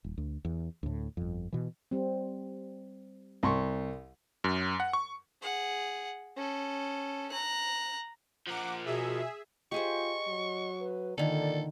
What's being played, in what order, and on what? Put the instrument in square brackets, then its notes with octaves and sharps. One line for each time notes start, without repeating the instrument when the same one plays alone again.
[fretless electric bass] D#1
D2
E2
D2 A2
G1 F2
B2 E3
[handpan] G3 C4
[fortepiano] C2 C6 C#6
[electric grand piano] F#2
F#5
C#6
[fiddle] G#4 F#5
C#4 A4
A#5 F#6
[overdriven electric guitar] F3 A#4 [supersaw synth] F#5 D6
[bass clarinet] B2 [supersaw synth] G#4 E5
[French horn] F4 [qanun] G4 G#4 C5 [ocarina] D#5 [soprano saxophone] C#6
[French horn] F#3
[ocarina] B4
[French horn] A#2 [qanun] D3 D#3 [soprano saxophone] A4 [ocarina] D5